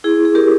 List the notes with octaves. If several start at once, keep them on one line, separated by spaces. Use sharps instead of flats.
E4 G#4
G#4
G4 A#4